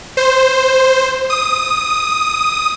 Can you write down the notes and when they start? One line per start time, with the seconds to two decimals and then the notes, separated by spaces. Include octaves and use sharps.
0.17 C5
1.30 D#6